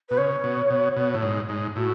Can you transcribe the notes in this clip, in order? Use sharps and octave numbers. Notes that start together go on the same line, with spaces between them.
B2 B4
C#3 C#5
B2
B2
B2
A2
G#2
G#2
A2 F#4